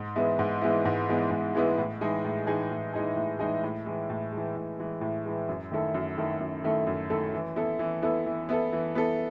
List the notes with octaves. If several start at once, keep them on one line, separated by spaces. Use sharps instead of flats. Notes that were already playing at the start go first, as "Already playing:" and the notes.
Already playing: G#2
E3 G#3 B3 E4
G#2
E3 G#3 B3 E4
G#2
E3 G#3 B3 E4
G#2
E3 G#3 B3 E4
A2
E3 G#3 D#4 G#4
A2
E3 G#3 D#4 G#4
A2
E3 G#3 D#4 G#4
A2
E3 G#3 D#4 G#4
A2
E3 G#3
A2
G#3
E3
A2
E3 G#3
A2
E3 G#3
F#2
D#3 A3 E4 A4
F#2
D#3 A3 E4 A4
F#2
D#3 A3 E4 A4
F#2
D#3 A3 E4 A4
E3
B3 E4 A4
E3
B3 E4 A4
E3
B3 E4 A4
E3
B3 E4 A4